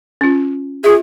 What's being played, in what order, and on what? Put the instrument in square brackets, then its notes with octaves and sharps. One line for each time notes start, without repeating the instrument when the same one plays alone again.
[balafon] C#4 F4
[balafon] F4 E5 [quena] G#4